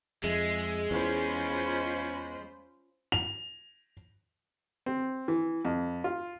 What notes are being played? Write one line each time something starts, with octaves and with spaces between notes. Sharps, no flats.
F2 G#3 E5
E2 C#4 F4 C5 B5
F7
C4
E3
F2
F4